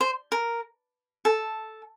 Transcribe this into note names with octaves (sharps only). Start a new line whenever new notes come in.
C5
A#4
A4